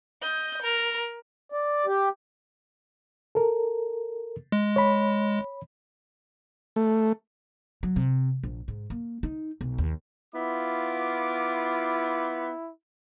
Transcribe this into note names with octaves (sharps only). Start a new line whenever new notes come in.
D#5 G6
A#4
D5
G4
A4 A#4
G#3
C#5 B5
A3
F#3
C3
A#1
G#2
A#3
D#4
B1
D#2
B3 E4 F4 D6